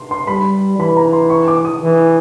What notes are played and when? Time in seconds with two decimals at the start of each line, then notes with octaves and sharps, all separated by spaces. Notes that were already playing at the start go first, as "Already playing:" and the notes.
Already playing: C6
0.11 C6
0.27 G3 B5
0.79 E3 B5
0.97 A#5
1.13 C6
1.30 C#6
1.48 D6
1.65 D#6
1.82 E3